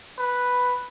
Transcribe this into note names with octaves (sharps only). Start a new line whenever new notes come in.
B4